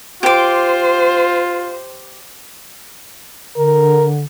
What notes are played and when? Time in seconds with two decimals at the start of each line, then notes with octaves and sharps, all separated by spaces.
0.23 F4 G4 C5 D6
3.57 D3 A#4